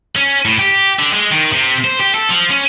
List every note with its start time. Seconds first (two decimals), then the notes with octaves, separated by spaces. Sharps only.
0.16 C#4
0.45 A2
0.59 G4
0.99 D3
1.13 G#3
1.31 D#3
1.52 C3
1.84 C5
2.00 G4
2.15 A4
2.30 F3
2.51 C#4